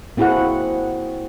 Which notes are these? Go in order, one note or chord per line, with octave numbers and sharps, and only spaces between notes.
A#3 C4 E4 F#4 G#4 F#5